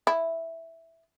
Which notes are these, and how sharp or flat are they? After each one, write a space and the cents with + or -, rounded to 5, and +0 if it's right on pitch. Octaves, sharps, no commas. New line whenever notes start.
E4 +0